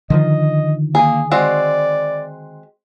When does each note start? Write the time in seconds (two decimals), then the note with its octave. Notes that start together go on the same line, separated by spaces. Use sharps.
0.10 D3 D#3 F3 D#5
0.95 A#3 G#4
1.31 G#3 C4 F#4 D5